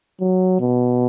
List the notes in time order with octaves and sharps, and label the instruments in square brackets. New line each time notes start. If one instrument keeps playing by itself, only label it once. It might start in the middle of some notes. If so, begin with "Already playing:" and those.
[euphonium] F#3
B2